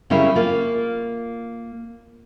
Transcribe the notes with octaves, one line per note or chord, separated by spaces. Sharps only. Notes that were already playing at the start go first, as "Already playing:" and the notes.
C#3 G3 C#4 E4 G#4 A#4
A#3 F4